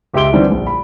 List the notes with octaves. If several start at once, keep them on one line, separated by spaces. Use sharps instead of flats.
C#2 G4 E5 C6 D7 G7
D3 E3 G3 C4 D4
A#1
B5